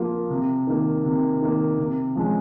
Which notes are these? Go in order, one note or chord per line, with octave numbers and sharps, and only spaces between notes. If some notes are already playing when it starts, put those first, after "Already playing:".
Already playing: F3 A#3 F4
C3
D#3 A#3
C3
D#3 A#3
C3
F3 G#3 C#4